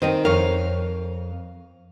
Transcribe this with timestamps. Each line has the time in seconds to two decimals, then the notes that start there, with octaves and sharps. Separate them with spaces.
0.02 D#3 C4 C5 D#5 G5
0.25 F2 A#4 C5 C#5 F5